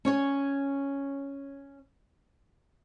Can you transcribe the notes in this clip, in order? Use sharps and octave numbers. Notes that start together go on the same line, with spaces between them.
C#4 C#5 G#5